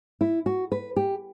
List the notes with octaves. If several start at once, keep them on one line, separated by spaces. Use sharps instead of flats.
E4
F#4
B4
G4